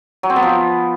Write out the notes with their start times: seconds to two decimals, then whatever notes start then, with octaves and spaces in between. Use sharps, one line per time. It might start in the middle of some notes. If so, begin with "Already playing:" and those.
0.23 F#3
0.30 C4
0.36 B3
0.43 F3